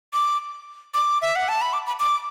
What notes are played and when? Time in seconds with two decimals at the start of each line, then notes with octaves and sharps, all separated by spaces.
0.13 D6
0.94 D6
1.22 E5
1.36 F#5
1.49 A5
1.61 B5
1.73 D6
1.87 B5
2.00 D6